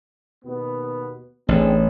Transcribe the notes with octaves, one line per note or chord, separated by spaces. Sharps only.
D#2 B2 B3
A1 C4 D4 G#4